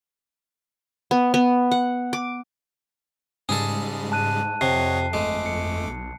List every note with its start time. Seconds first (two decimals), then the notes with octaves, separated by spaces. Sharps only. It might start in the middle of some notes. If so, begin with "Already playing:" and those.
1.11 B3
1.34 B3
1.71 F#5
2.13 D6
3.49 G#2 C#3 G3 G#3 G#4 A4
4.12 A5 F#6 D#7
4.61 F2 C3 C#5 D#5 F#5 C7
5.13 G1 G#3 A3 D6
5.46 C#7
5.87 B1